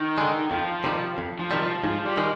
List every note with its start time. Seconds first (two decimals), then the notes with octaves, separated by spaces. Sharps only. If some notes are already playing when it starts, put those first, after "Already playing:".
Already playing: D#3
0.18 D3 G#3
0.51 F2 F3
0.84 C3 D#3 G3
1.18 F2
1.39 F3
1.51 C3 D#3 G3
1.62 F3
1.84 G#2 F3
2.05 G3
2.17 D#3 G#3